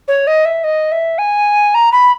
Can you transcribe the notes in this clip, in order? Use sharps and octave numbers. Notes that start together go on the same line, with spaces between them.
C#5
D#5
E5
D#5
E5
G#5
A#5
B5